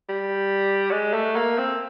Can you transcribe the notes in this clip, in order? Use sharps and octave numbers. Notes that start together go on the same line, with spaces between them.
G3
G#3
A3
A#3
C4